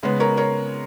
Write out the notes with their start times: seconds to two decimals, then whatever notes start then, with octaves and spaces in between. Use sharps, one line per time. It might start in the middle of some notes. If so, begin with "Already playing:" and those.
0.03 C#3 G#3 B3
0.20 A#4 C#5
0.37 A#4 C#5